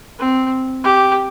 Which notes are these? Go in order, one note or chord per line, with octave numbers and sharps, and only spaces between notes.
C4
G4